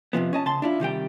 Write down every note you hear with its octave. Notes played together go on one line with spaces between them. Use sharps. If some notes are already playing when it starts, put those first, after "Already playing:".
F2 C3 F3 B3
C#4 D#5 A5
C#3 A5 C6
D4 E4 F4
C3 D#3 G3 G5